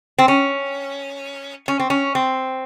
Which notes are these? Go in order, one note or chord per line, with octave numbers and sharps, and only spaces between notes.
C4
C#4
C#4
C4
C#4
C4